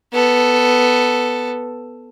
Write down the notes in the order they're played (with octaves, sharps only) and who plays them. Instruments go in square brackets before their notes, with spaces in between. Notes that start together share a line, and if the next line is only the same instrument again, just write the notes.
[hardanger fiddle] B3 A4